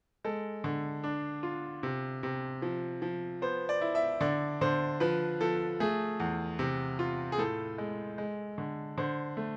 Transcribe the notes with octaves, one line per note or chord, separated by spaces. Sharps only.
G#3 A4
D3
D4
F4
C3
C3
F3
F3
B3 C5
D5
E4
E5
D3 D5
D3 C5
F3 B4
F3 A4
A3 G#4
E2
C3
F4
G#4
A2 A4
G#3
G#3
D3
D3 C5
A3